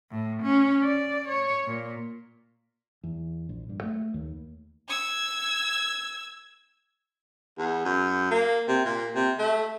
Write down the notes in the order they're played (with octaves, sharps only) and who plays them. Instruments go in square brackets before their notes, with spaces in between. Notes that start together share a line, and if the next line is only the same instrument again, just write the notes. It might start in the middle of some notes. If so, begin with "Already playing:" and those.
[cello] A2
C#4
D5
C#5
A#2
[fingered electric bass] E2
A#1
G2
A3
D#2
[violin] E6 G#6
[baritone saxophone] E2
F#2
A#3
C3
A#2
C3
A3